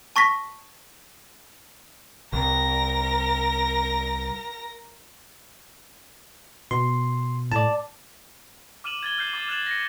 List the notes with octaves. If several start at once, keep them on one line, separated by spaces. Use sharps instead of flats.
A5 C#6 A#6 B6
C2 A#4 A#6
B2 C6
A2 D5 A5
D6 F6 D#7 E7 F#7
G#6 A6 G7
F6 G6 C7
D6 A6
F6 F#6 A6 E7 F#7
A#6 C#7